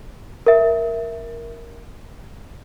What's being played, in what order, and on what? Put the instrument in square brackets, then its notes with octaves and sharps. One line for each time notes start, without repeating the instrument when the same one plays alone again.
[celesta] A#4 E5